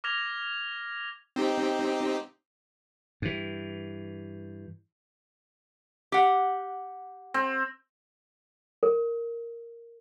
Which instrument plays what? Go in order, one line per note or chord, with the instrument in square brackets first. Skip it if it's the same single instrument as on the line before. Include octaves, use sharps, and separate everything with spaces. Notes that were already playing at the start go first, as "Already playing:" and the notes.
[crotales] D6 F6 G#6 A#6 F7
[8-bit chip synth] C4 D#4 G4
[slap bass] G2 E3
[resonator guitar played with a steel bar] G4 F#5
[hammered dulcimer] C4
[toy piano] A#4